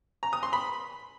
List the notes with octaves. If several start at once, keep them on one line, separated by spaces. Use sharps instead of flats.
A#5
D#6
C6
B5